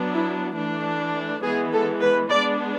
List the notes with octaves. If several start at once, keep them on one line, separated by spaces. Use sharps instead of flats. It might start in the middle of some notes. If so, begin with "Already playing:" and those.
Already playing: F#3 B3 D4
E4
E3 A3 D4
E3 G#3 B3 G#4
A4
B4
G#3 B3 D4 D5